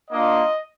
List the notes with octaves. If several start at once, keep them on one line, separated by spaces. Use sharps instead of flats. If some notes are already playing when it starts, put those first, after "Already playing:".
A#3 D4 F4 D#5